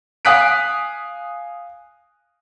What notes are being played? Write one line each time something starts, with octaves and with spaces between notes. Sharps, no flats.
F5 G#5 D#6 F#6 B6 D7